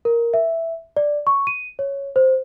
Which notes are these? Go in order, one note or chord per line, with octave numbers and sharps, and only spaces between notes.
A#4
E5
D5
C#6
D#7
C#5
C5